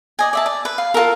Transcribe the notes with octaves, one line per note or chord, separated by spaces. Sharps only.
D5 D#5 G#5
D5 E5 A5
D5
B4
F5
F4 F#4 A4 A#4